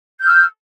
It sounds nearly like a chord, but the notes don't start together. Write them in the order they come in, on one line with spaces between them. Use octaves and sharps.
G6 F6 E6